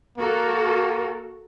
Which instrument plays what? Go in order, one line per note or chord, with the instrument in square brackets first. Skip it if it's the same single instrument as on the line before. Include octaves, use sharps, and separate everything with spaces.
[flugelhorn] A#3 [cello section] F#4 A4 A#4